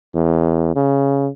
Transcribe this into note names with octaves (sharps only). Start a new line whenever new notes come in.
E2
C#3